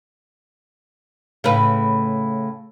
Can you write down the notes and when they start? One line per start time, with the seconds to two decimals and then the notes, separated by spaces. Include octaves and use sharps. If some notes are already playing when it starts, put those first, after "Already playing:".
1.44 A2 C#3 B4